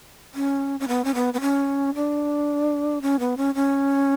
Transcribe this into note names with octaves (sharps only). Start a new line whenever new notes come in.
C#4
C#4
B3
C#4
B3
B3
C#4
D4
C#4
B3
C#4
C#4